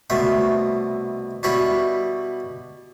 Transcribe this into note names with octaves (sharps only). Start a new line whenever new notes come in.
C2 B2 A3 E5
B2 G3 E4 C#5 B5